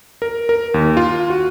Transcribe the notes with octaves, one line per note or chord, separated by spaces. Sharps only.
A#4
A#4
D#2
F4
F#4